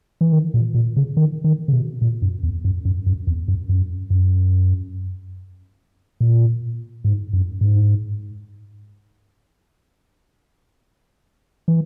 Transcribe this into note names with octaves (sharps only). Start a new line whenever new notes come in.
E3
D#3
A#2
A#2
C#3
D#3
D#3
C#3
B2
A#2
F#2
E2
F#2
F#2
F#2
E2
F#2
F#2
F#2
A#2
G#2
F#2
G#2
E3